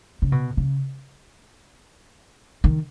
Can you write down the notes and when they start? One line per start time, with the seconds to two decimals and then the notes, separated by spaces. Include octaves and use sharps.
0.22 C#3
0.32 B2
0.57 C#3
2.64 D#3